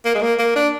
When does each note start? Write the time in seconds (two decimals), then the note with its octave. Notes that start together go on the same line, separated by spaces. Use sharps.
0.05 A#3
0.15 G#3
0.22 A#3
0.39 A#3
0.56 D4